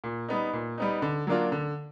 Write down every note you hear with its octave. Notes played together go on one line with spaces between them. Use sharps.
A#2
G3 B3 D#4
A#2
G3 B3 D#4
D3
F#3 A#3 D4 F4
D3